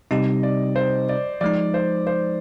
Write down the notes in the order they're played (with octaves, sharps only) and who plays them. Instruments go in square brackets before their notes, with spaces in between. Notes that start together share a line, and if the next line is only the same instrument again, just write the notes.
[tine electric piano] C3 G3 C4 D#4 G4 [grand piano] D#5
[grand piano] D5
C5
D5
[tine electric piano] F3 G#3 D#4 [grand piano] D5
[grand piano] C5
C5